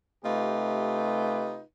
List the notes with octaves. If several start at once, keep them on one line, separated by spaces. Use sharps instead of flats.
C3 A3 D#4 F4 G4 B4